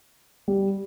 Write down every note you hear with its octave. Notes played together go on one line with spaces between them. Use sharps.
G3